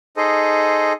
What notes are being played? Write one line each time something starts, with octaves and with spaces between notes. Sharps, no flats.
D#4 G#4 A4 C5 D#5